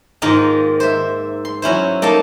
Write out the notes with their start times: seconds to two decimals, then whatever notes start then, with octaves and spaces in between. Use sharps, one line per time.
0.22 G#2 D#3 A#3 D#4 F4
0.80 C5 E5
1.45 C6
1.62 F#3 C#4 E4 C5
2.02 A#3 D#4 A4 A5